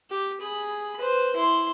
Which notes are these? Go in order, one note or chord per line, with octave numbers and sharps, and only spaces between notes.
G4
G#4 B5
B4 C5
E4 C6